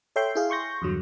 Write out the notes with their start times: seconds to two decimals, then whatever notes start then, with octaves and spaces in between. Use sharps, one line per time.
0.16 A4 C#5 E5 G5 C6 G6
0.35 E4 G#4 F5
0.50 C6 C#6 G6 A#6
0.82 E2 G2 D3 F#3